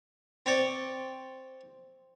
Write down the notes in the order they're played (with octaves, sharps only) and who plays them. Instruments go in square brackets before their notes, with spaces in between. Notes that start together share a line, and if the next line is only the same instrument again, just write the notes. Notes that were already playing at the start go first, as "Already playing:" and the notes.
[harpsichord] C4 C#5 D5